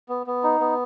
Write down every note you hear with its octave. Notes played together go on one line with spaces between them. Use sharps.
B3
B3
D#4
B3